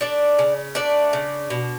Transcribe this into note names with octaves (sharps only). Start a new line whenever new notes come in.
A3 D4 D5
C#3
A3 D4 D5
C#3
B2